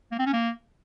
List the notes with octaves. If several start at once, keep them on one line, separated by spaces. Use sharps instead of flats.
A#3
C4
C#4
A#3